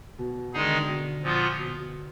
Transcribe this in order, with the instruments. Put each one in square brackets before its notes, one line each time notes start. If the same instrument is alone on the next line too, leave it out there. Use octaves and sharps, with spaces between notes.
[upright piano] B2
[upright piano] D3 [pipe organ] D#3 G#3 D#4 G#4
[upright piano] B2
[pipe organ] A#2 F3 B3 F4
[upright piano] B2
B2